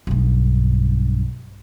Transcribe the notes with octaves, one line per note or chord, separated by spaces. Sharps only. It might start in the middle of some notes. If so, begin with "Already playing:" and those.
B1 G2